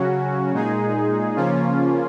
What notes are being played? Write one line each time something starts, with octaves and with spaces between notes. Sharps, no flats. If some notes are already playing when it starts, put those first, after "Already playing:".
Already playing: C#3 F#3 C#4 F#4
A#2 G#3 D#4 G#4
C#3 F3 A#3 C#4 F4